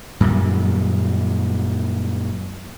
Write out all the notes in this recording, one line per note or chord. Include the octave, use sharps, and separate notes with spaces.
F#2 A#2 D#3 G3